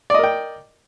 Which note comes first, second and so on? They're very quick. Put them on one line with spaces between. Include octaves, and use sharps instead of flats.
D5 D#5 A#4 G5